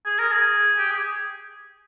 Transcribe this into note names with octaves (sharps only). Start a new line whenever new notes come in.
G#4
A#4
G#4
G4
G#4